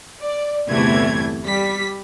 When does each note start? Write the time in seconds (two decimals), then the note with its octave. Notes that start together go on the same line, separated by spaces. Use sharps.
0.21 D5
0.69 G1 E2 C3 E3 A3 G#6
1.45 G3 B6